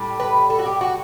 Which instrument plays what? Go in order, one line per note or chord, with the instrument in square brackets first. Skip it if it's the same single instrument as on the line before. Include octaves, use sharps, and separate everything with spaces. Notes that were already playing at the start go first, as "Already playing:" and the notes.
Already playing: [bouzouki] A2 G3
B4
A4
F#4
G4
F#4